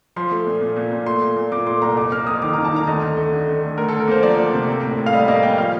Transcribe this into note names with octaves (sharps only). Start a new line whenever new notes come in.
F3 C6
A3
A#2
A#2
A#2
A#2
A3 C6
A#2
A#2
A#2 D6
A3 C6
C2 A#5
F2 D6
A#3 F6
F2 D#6
D#3 D6
A#5
D#3
A5
D#3 A#5
D2 D#5
D2
A3
D3
D3
A3
D2 A#4
A4
D2
A#4
A#3 C5
F3 D5
D2
C3
A#3
A2
A2
F5
G3 D#5
A#3 D#5
G3 G5
F3 F5